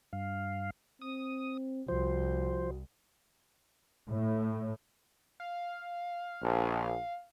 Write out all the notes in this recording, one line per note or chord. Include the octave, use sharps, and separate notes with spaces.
G2 F5
C4 D#6
C2 F3 F#4 C5
A2
F5
A#1